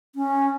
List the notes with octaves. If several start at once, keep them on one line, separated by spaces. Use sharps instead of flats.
C#4